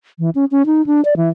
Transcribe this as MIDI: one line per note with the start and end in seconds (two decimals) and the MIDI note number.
0.19 0.30 52
0.35 0.45 61
0.51 0.65 61
0.66 0.85 63
0.86 1.03 62
1.05 1.14 74
1.17 1.29 52